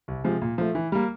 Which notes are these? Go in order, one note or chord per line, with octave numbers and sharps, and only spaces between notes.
C2
C3 F3 G#3
A#2
F3 A3
E3
G3 A#3